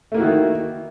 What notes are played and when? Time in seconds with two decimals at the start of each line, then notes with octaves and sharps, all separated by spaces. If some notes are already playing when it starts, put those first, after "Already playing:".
0.12 A3
0.14 A#3
0.17 E4
0.20 F#4
0.23 D#3